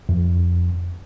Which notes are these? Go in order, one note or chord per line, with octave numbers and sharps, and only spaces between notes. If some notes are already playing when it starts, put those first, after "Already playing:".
F2